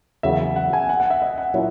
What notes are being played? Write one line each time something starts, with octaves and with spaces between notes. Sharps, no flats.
E2 C#3 F#3 A#3 E5
F#5
G#5
F#5
F#5
E5
D#5
F#5
A#2 F#3 C#4 E4